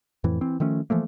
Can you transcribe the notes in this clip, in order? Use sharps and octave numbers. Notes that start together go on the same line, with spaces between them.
F2 A2 E3
E3 C4
D#3 F3 A3 C#4
E3 F3 A3 A#3